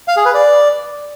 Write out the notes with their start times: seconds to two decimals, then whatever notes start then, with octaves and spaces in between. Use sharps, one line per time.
0.08 F5
0.17 G#4
0.25 B4
0.34 D5